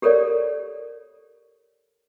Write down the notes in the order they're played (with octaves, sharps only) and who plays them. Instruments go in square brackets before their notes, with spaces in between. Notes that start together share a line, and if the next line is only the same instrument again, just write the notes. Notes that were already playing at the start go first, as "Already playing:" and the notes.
[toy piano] G4 A4 A#4 C#5 D5